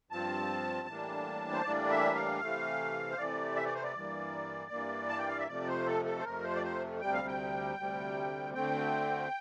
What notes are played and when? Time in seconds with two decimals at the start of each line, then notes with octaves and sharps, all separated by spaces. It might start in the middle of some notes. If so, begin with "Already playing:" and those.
0.11 G2 F3 C4 A5
0.87 A2 E3 G3 A#3 D4
1.53 C5
1.64 A2 E3 G3 A#3 D4 D5
1.90 E5
2.15 F5
2.41 C3 E3 A3
3.10 C5
3.17 C3 E3 A3 D5
3.56 E5
3.65 D5
3.75 C5
3.83 D5
3.94 G2 E3 A#3
4.71 G2 E3 A#3
5.09 A5
5.19 G5
5.28 F5
5.38 E5
5.47 F2 C3 F3 A3 D5
5.67 C5
5.86 A4
6.05 A4
6.19 C5
6.24 F2 C3 F3 A3 A#4
6.43 C5
6.55 D5
6.63 C5
7.01 D2 C3 G3 G5
7.14 F5
7.27 G5
7.77 D2 C3 G3
8.54 D2 D3 A3 C4 G5